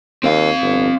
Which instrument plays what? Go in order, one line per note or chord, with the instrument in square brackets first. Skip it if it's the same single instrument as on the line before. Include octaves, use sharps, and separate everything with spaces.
[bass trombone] D#2 [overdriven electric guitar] C4 F5
[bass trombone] G1